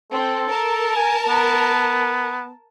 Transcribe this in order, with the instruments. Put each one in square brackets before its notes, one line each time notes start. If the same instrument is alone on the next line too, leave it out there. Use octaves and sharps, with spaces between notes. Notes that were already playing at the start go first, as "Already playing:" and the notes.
[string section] C4 [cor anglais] A4
[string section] A#4 A5
[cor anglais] G#5
B3